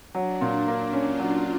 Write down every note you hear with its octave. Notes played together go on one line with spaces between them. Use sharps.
F#3 D4
A#2
A#3
C#4 F4
F#3